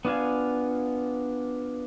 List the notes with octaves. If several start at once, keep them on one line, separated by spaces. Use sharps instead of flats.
B3 D4 F4 F5 G#5